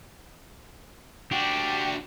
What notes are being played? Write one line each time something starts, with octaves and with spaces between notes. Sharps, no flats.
D4 F#4 G4